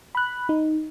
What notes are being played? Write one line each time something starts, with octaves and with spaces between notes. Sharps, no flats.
B5 F#6
D#4